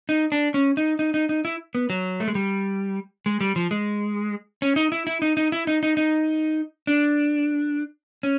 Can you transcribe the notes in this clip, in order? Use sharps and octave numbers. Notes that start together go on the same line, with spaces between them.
D#4
D4
C#4
D#4
D#4
D#4
D#4
E4
B3
F#3
A3
G#3
G3
G#3
G3
F3
G#3
C#4
D#4
E4
E4
D#4
D#4
E4
D#4
D#4
D#4
D4
C#4